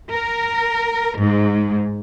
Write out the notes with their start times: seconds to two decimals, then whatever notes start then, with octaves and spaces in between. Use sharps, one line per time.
0.10 A#4
1.19 G#2